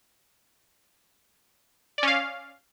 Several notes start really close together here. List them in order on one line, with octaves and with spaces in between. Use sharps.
D5 C#4 F5